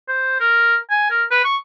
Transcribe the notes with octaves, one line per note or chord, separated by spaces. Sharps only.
C5
A#4
G#5
A#4
B4
C#6